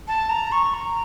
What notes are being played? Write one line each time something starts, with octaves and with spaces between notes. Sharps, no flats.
A5
A#5
C#6
A#5